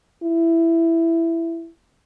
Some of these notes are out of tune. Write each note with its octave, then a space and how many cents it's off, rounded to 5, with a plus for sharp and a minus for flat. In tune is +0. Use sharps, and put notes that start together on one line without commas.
E4 +10